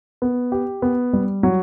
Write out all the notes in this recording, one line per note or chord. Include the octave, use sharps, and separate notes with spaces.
B3
G4
B3
G3
F#3